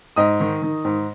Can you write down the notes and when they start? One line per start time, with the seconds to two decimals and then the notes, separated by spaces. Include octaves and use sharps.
0.16 G#2 D#5 D#6
0.40 D#3
0.62 D#3
0.85 G#2